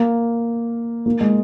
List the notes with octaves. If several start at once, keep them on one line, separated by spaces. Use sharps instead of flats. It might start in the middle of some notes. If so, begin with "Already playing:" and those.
Already playing: A#3
A#3
G#3